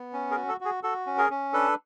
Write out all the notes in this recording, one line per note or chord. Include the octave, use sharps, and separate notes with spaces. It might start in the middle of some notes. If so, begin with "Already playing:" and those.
Already playing: B3
C#4
G#4 A#4
F#4
A4
F#4 G#4
F#4 A4
C#4
G#4 A#4
C#4
D4 A4 B4